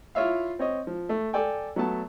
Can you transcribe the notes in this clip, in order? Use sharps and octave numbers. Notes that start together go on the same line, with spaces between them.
E4 F4 C#5 E5 F5
C4 C#5 D#5
F3
A3
A4 D5 G5 G#5
F#3 A3 B3 A5